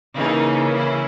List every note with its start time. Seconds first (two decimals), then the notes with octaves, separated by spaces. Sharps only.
0.18 C#3 E3 A#3 C#4 D#4
0.75 E4